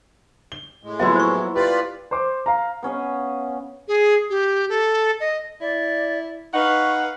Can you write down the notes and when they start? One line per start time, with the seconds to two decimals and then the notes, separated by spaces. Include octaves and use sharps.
0.52 G7
0.83 A2 G#3
1.00 F3 F#3 A#3 B3 E4 E5 C6
1.16 C5 C#6
1.56 F4 G4 B4 D5 C6
2.11 C5 D6
2.46 F5 A#5
2.83 B3 C#4 D#5 F5
3.88 G#4
4.30 G4
4.69 A4
5.20 D#5
5.61 E4 D5
6.54 D#4 B4 F5 F#5 C#6